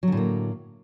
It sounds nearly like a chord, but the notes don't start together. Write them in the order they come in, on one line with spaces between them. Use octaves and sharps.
F#3 D3 A2 A#3